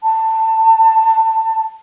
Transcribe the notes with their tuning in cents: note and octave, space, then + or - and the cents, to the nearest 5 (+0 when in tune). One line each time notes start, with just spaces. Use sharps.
A5 +20